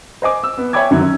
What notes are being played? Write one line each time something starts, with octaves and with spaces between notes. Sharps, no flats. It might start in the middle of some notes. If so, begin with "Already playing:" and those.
C5 D#5 G#5 D6
E6
B3
C#5 E5 G5 G#5 D6 G#6
F#2 D3 D#3 F#3
C#4